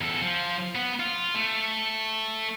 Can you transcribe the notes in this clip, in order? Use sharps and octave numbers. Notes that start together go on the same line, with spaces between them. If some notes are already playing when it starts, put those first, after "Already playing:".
E2 A4
F3
B3
F4
A3